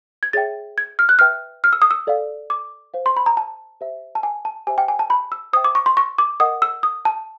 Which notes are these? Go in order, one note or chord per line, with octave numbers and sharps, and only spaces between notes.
G#6
G#4 C#5 E5 G5 A6
G#6
F6
F#6
B4 E5 G5 F6
F6
E6
D#6
E6
A4 D5 F5
D6
C5 F5
C6
B5
A#5
A5
G4 C5 E5
A5
G#5
A5
G4 C5 E5 G5 G#5
G5
G#5
A5
B5
E6
C5 E5 G5 D#6
D6
C#6
C6
C#6
D6
A#4 D#5 F#5 D#6
E6
D#6
A5